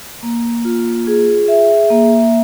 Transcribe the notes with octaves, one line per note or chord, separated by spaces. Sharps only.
A#3
F4
G#4
E5
A#3